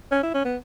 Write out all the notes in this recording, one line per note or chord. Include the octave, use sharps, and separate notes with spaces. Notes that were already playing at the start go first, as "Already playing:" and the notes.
C#4
E4
C#4
B3